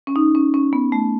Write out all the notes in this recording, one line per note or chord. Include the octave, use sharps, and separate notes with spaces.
C#4
D#4
C#4
C#4
B3
A3